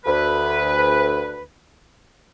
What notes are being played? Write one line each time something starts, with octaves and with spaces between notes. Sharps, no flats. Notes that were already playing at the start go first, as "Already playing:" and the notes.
D2 B4